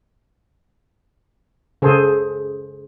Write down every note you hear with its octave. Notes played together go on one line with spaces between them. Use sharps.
C#3 G#4 A4 C5